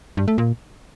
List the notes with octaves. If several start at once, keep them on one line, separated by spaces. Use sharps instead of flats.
G2
A3
A#2